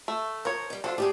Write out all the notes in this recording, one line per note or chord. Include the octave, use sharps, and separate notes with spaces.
A3
F3 A#4 C#5
G3 D#4
F#3 D4 F4 G#4 A4 C5
A3 E4 G4 G#4 D5 F5 A5